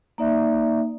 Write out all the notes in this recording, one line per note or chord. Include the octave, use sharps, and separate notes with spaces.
A#3 D#4 D5 E5